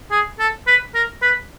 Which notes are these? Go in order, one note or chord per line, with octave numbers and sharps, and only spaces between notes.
G#4
A4
B4
A#4
B4